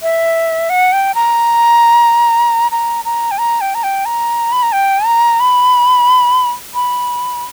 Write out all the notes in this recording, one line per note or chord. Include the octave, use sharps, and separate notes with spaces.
E5
F#5
G5
A#5
A#5
A#5
G5
A#5
G5
A#5
G5
A#5
B5
A#5
G5
A#5
B5
B5